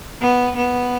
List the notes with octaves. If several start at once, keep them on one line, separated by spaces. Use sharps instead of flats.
B3
B3